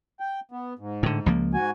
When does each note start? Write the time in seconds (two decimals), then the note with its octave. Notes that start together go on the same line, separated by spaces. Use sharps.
0.20 G5
0.51 B3
0.79 G#2
1.03 A2 D3
1.26 C#2 F3 A#3
1.54 G#2 F#4 G#5